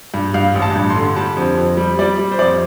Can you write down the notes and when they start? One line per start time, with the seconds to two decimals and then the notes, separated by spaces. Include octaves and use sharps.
0.14 G2
0.34 G2 F5
0.55 A1
0.62 A5
0.75 G2
0.90 C6
0.96 D3
1.16 G3 A5
1.37 F2
1.57 F2
1.77 G3
1.99 G3 D5
2.19 G3
2.32 C5
2.39 F2 D5